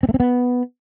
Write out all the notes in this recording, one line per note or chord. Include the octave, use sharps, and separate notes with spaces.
C4
A3
C4
B3